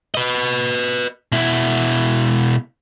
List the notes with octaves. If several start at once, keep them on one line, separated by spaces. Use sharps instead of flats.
B4 D#5
B2 E4